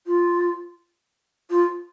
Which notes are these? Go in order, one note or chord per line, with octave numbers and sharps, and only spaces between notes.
F4
F4